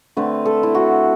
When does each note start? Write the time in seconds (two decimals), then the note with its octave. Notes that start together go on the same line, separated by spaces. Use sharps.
0.17 D3 A3 C4 B4
0.46 A4
0.63 E4
0.75 F#4